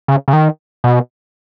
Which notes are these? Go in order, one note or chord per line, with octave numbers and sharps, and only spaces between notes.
C#3
C#3
D#3
B2